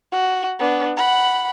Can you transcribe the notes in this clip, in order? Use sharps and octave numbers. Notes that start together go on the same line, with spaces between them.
F#4
B3 D4
F#5 B5